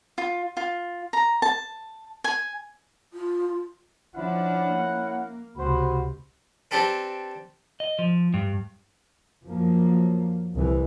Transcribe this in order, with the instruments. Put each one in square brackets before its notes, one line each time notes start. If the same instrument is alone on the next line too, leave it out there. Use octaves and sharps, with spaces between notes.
[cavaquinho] F4
F4
A#5
A5
G#5
[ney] F4
[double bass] F3 D4 [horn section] C#4 E4 F#5
[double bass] A#3
[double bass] C#2 C3 [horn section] F#4 C5 B5
[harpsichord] C4 D4 G4 A4 B4
[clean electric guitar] D#5
F3
G2
[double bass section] F#2 F3 A#3
C2 E3